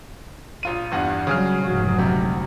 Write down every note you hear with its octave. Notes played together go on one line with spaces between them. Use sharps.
A#1 F4 D#7
E2 G2 F#5
C#3 F#3 G3 G#4 F6
F1 G#2 F#3
D2 C3